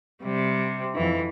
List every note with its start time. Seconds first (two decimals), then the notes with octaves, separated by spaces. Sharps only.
0.22 C3 G3
0.95 F2 E3